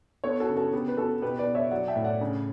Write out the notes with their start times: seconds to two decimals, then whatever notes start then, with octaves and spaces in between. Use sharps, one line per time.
0.24 B3 A4 C#5
0.40 F#4 A4
0.49 C#3
0.56 F#4 A4
0.73 B3 G4
0.88 B4
0.97 B3 F#4 A4
1.22 B2 G4 B4
1.38 B4 D5
1.47 B2
1.55 C#5 E5
1.71 F#3 D5 F#5
1.88 E5 G5
1.96 A2
2.04 D5 F#5
2.21 C#3